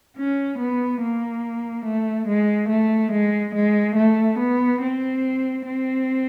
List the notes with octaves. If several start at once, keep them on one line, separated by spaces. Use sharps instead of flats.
C#4
B3
A#3
A3
G#3
A3
G#3
G#3
A3
B3
C4
C4